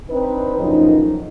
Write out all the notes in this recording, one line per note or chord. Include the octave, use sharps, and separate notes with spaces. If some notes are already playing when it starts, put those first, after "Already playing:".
C4 D4 D#4 B4
F#2 A2 C#3 F3 D#4